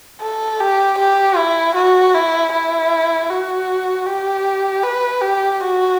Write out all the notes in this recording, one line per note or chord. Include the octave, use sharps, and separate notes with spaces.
A4
G4
G4
E4
F#4
E4
E4
F#4
G4
B4
G4
F#4